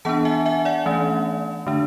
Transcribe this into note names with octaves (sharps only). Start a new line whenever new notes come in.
E3 B3 D4 F#5 A5
E5 G#5
E5 G#5
D5 F#5
E3 A3 C#4
D3 A3 D4